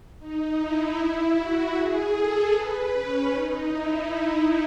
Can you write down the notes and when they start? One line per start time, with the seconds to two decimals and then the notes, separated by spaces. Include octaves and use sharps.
0.19 D#4
0.58 E4
1.36 F#4
1.74 G#4
2.13 A4
2.52 B4
2.92 C#4
3.31 D#4
3.69 E4